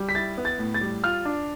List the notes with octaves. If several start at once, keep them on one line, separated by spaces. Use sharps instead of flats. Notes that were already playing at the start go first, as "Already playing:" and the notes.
Already playing: G3
B6
E4 A6
B3
A6
A2
A6
G3
F4 F6
D4